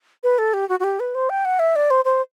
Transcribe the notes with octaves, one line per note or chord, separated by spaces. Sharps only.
B4
A4
G4
F#4
F#4
G4
B4
C5
G5
F#5
E5
D5
C5
C5